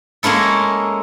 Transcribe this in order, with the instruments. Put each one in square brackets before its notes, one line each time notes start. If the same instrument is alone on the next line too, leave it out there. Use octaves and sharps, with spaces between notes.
[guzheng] G#3 A#3 C#4 E4 A4